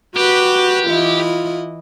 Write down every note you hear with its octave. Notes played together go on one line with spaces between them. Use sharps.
F#4 G4 B4
E3 E4 F4 D#5